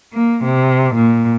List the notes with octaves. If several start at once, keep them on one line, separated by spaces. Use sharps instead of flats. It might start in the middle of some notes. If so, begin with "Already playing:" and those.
A#3
C3
A#2